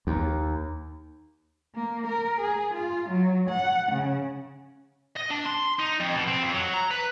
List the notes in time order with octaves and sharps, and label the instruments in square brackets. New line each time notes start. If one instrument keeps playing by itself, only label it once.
[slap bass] D#2
[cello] A#3
A#4
G#4
F4
F#3
F#5
C#3
[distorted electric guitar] D#5
D4
C6
D#4
F2
B2
C4
F2
F#3
A#5
B4